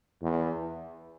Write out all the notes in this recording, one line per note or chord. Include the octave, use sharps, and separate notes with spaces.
E2